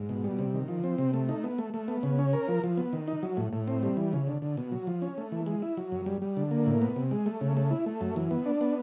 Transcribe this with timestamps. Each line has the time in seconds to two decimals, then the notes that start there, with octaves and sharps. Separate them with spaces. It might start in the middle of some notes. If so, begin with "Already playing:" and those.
Already playing: G#2
0.09 B2
0.24 G3
0.39 C3
0.54 D#3
0.68 F3
0.84 C4
0.98 C3
1.14 A3
1.29 D#4
1.44 B3
1.58 A3
1.74 A3
1.88 B3
2.03 C#3
2.19 C#4
2.33 A#4
2.48 F3
2.64 F3
2.77 B3
2.93 D#3
3.08 D#4
3.23 F#3
3.37 A2
3.53 A2
3.68 C4
3.83 G3
3.97 E3
4.13 C#3
4.27 D3
4.42 D3
4.57 B2
4.72 F#3
4.87 F3
5.02 C#4
5.18 A3
5.32 E3
5.46 G#3
5.62 E4
5.77 F#3
5.92 F#2
6.06 G3
6.22 G3
6.37 D3
6.51 A#3
6.66 A2
6.82 B3
6.96 C3
7.11 G#3
7.26 A3
7.41 C#3
7.57 A3
7.71 E4
7.86 A3
8.01 F#2
8.16 E3
8.31 B3
8.46 D4
8.61 B3